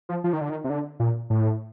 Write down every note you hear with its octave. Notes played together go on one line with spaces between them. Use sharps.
F3
F3
D#3
D3
D#3
C3
D3
A#2
A2